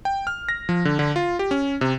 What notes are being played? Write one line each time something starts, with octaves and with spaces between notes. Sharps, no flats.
G5
F6
A#6
F3
D3
D3
F4
G4
C#4
C3